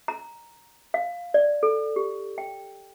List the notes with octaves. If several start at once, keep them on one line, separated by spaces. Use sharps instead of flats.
A#5
F5
D5
A4
G4
G5